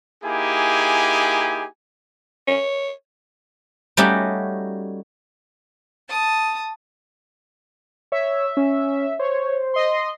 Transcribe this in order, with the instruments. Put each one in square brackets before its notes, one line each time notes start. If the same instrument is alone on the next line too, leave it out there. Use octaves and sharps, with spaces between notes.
[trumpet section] A#3 D#4 E4 G4 G#4 G#5
[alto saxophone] C#5
[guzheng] G3 A3 C#4 D#4 F#4 G4
[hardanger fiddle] A5 D#6
[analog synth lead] C#5 [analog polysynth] E5
[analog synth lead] C#4
[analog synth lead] C5 [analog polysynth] C#5
[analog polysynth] D#5 C6